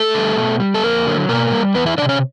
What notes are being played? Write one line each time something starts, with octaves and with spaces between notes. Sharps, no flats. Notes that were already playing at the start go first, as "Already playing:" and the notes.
Already playing: A3 A4
D3 G3
B2
G3
A4
F2 A#3 A#4
D3 F#3
B2 A#3 A#4
G3
E2 B3 B4
E4 E5
F3 D4 D5
C3
C#4 C#5